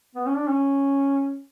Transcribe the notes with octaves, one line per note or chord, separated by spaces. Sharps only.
B3
C#4
D4
C#4